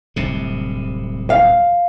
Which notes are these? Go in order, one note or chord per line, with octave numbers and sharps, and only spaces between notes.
D1 C2 C3
F5